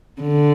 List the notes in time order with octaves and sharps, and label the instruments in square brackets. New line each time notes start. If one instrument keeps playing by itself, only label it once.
[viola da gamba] D3